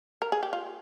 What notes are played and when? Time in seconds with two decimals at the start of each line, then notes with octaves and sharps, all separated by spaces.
0.22 A#4
0.32 G#4
0.43 G4
0.53 F4